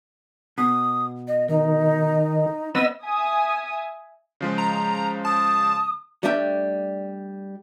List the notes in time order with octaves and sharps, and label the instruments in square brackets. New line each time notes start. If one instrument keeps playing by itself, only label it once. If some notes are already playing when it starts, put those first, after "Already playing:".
[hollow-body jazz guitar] B2 [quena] D#6
[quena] D#5
[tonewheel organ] D#3 [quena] D#4
[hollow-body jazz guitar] B3 C4 B4 [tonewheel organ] D#5 E6 [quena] B5
[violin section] E5 G#5 D#6
[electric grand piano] C#3 F3 G#3
[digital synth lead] A#5
[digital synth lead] A5 [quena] D#6
[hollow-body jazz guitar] G3 A3 D4 E5 G5